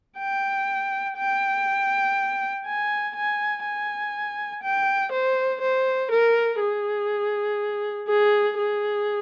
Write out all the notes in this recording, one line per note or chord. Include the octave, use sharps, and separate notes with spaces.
G5
G5
G#5
G#5
G#5
G5
C5
C5
A#4
G#4
G#4
G#4